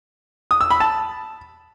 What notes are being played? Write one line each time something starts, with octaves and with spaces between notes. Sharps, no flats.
D#6
E6
B5
A5